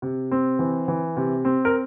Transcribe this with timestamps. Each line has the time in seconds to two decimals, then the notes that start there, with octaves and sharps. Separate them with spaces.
0.02 C3
0.31 C4
0.59 E3
0.88 E3
1.17 C3
1.45 C4
1.65 A#4